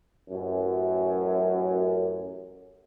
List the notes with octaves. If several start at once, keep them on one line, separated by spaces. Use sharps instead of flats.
A1 F#2